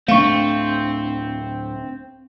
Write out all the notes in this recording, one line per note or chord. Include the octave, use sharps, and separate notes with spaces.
D1 A3 C4 D4 F5 C#6